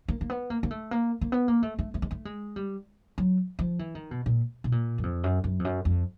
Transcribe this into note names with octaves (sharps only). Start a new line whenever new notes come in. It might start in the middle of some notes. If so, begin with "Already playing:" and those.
A#3
A#3
B3
A#3
A#3
A3
A#3
A#3
B3
A#3
A3
A3
A3
G#3
A3
G#3
G3
F#3
F3
E3
D#3
B2
A#2
B2
A#2
F#2
F2
F#2
F#2
F2
F#2
F2